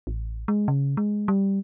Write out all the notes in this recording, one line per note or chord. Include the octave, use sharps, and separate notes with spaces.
A1
G#3
C#3
G#3
G3